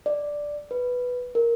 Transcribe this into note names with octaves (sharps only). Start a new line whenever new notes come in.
D5
B4
A#4